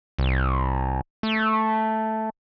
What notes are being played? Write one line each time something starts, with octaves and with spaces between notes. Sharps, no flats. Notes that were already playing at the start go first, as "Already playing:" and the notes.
C2
A3